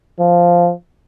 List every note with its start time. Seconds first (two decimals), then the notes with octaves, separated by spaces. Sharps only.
0.20 F3